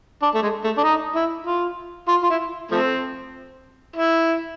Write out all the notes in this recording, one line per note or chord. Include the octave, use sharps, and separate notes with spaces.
D4
A3
G#3
A3
D4
D#4
E4
F4
F4
F4
E4
F3 A3 C4
E4